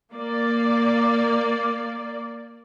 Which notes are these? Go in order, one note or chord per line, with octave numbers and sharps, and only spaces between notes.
A#3 D5